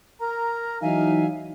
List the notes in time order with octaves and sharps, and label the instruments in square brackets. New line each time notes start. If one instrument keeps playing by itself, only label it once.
[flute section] A#4 A#5
[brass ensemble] E3 F#3 D#4 [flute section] E5 F5 G#5